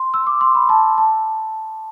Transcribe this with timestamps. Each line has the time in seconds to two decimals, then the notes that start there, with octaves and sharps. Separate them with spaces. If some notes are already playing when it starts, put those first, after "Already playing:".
Already playing: C6
0.14 E6
0.27 D6
0.41 C6
0.55 B5
0.69 A5
0.98 A5